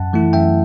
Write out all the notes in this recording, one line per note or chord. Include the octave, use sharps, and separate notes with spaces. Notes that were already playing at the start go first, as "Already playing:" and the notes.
Already playing: F#2 F#5 A5
E3 A3 E4
F#2 E5 G5